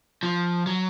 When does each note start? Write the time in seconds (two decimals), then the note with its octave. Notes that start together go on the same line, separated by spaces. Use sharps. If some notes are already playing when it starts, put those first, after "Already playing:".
0.23 F3
0.67 F#3